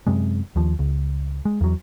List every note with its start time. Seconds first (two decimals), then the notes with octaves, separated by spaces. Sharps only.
0.07 F#2 C3 G#3
0.56 D#2 F3
0.79 C#2
1.45 G#3
1.61 E2 F#3